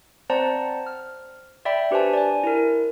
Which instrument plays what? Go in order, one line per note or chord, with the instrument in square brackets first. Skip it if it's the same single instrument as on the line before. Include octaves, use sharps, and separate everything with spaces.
[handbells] C4 C5 D5 F#5 A5 A#5
F6
D5 E5 G5 B5
D4 G4 B4 C5 G#5 A5
D5 G#5
E4 A#4